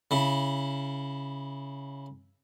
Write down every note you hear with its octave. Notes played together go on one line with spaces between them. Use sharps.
C#3 E4